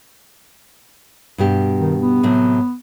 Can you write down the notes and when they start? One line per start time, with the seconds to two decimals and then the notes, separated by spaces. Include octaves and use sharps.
1.38 G2 B2 G4
1.80 D#3
2.01 B3
2.23 A2 C3 F#3